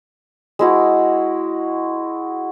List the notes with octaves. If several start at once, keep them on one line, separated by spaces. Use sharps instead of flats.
G#3 E4 F#4